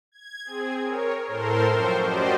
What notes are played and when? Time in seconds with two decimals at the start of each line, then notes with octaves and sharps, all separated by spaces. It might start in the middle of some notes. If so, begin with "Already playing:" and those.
0.12 G#6
0.45 C4 G#4
0.82 A#4 C#5
1.27 A2 A4 A#4 C5 C6
1.71 F#2 F3 C5 G5 C#6
2.02 C#4 F#4 G4 C5 D5 D#5